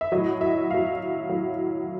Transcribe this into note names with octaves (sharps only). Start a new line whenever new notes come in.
E5
A2 F#3 D#5
E5
A2 F#3 F5
A2 F#3